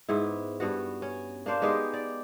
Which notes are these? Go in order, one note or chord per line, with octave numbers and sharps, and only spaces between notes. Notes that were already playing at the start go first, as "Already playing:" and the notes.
G#2 B3 E4
G2 B3 F#4
C#4
A#3 D4 C5 F5
G#3 B3 D#4 G4
D5